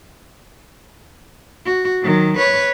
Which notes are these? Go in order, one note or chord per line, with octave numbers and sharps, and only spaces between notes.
F#4
D#3 F#3
B4 C#5